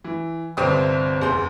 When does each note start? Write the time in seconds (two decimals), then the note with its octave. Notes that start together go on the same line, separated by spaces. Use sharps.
0.04 E3
0.57 G1 C2 C4 D4 G5 D#6
1.22 F#1 E2 C6 G6